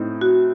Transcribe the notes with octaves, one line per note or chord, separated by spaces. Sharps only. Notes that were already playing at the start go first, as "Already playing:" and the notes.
Already playing: A2 C4 D#4
F#4